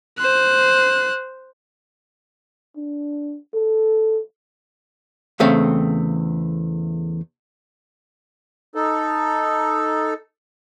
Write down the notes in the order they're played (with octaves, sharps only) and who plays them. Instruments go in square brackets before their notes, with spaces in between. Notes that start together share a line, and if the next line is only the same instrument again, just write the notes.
[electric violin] C5 F#6
[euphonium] D4
A4
[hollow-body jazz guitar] E2 C#3 A3 C4 F5
[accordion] D#4 A4